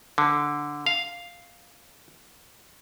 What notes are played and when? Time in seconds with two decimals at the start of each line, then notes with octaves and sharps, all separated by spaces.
0.18 D3
0.86 F5